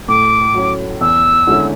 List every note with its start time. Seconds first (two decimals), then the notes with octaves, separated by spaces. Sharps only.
0.09 A2 D6
0.54 F#3 C#4
1.01 E2 E6
1.47 D3 G#3 C#4 E4